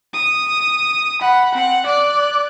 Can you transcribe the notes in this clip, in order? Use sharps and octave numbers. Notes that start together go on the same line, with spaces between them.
D#6
F#5 B5
C4 F#5
D5 F#6